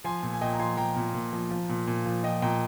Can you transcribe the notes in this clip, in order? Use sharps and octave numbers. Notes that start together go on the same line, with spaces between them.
F3 G#5 C6
A#2
G#5
A#2 D#5 G5
A#5
F3 G#5 C6
F3 G5 A#5
A#2
A#2
F3
F3
A#2
A#2
F3
F3 D#5 G5
A#2 G5 A#5